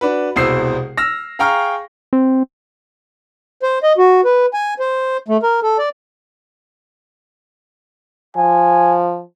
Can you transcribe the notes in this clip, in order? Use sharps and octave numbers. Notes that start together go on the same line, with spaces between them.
D4 F#4 B4
E1 C2 B2 C5 E6 C7
E6 F6 A#6
G#4 F5 G5 A#5 C#6 F6
C4
C5
D#5
F#4
B4
G#5
C5
A3
A#4
A4
D5
F3 G#5